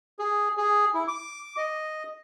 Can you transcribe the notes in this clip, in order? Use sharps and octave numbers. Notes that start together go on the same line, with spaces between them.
G#4
G#4
E4
D6
D#5